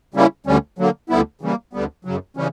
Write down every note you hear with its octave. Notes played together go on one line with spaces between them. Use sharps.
C#3 G3 A#3 C#4 E4
D2 D3 G3 C#4
D3 F#3 A#3
D2 D3 G3 B3 E4
C#3 E3 G3 A#3
D2 D3 G3 B3
F#2 C#3 F#3
C#3 E3 G3 C#4